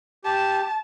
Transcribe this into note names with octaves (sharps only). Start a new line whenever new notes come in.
G4 A5